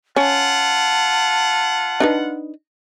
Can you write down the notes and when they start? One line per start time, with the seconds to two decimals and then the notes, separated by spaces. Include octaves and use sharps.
0.16 C#4 F4 F#5 A5
2.00 D4 D#4 B4